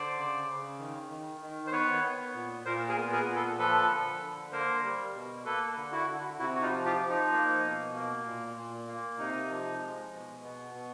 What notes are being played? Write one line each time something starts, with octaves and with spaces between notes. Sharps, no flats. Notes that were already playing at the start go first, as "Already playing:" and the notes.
Already playing: D3 C5 D5
C#3
C#3
D#3
D#3
D#3
C5
B3 B4 C#5
B3
A#2
A#2 A#4 C5
G#4 A#4
B3
G#4 A#4
A#2
A4 B4
F3 A4 B4
D3
D3
A#3 A#4 C5
G3
B2
A#3 A4 B4
D3
E4 F#4
D3
C3 E4 F#4
F#4
D#4 F4
F3
F4 G4
F3
D#4
A#3
B2
A#3
A#2
A#2
A#3
C3 D#4
F3
G#3
B2
B3
B2